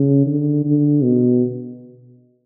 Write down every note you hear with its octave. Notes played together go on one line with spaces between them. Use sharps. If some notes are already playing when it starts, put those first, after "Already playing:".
Already playing: C#3
D3
D3
B2